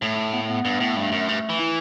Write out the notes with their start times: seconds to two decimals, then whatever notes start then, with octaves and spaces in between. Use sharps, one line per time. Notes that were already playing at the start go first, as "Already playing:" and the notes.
0.02 A2 A3
0.33 B3
0.41 A3
0.49 B3
0.65 G2
0.80 A2
0.96 G2 A3
1.12 F#2
1.28 G2
1.49 E3
1.60 E4